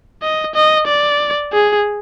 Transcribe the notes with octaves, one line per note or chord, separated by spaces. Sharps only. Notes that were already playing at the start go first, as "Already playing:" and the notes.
D#5
D#5
D5
G#4